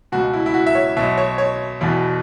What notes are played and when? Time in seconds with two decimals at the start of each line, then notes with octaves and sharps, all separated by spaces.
0.12 C#2 B2 F#4
0.33 E4
0.46 E4
0.54 F#4
0.67 E5
0.75 C#5
0.96 B1 B2 E5
1.18 C#5
1.38 C#5
1.81 E1 E2 B2 E4